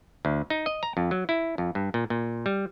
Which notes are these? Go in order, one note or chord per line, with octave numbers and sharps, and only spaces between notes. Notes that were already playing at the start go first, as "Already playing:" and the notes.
D2
D#4
D#5
A#5
F2
F#3
E4
F2
G2
A#2
A#2
G3